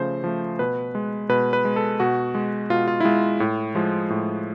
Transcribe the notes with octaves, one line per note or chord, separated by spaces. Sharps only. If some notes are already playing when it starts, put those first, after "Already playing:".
Already playing: C#3 F3 A3 C5
F3 A3
B2 B4
G#3
B2 B4
B4
G#3
A4
B2 F#4
G#3
B2 F4
F4
E4
G#3 F4
A2
F3 G#3
A2